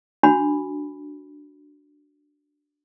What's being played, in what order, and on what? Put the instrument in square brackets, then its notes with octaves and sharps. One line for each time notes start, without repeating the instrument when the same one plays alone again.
[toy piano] D4 F#4 B5